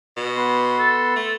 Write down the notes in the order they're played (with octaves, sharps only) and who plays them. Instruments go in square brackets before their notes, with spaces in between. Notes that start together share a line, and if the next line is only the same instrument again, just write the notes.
[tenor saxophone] B2
[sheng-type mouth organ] B3 C6
[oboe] A4
[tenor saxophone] A3